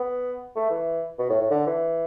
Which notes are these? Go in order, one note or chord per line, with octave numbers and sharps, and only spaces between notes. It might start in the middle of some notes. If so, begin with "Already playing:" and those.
Already playing: B3
A3
E3
B2
A2
A2
D3
E3